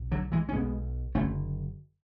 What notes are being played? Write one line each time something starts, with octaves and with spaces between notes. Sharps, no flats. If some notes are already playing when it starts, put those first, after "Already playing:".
Already playing: B1
D3 F#3
E3 G#3
C#4
B1 B2 G#3 B3
F#1 F#2 D3 A3 C#4